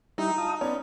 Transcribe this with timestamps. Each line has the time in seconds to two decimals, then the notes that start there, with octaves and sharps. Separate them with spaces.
0.18 G3 D#4 E4
0.38 F4 A5 D#6
0.61 B3 C#4 D5